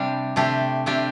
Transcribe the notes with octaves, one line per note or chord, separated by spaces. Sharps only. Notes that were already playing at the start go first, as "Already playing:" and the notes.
Already playing: C3 G3 D4
C3 A3 D4 G4
C3 A3 D4 G4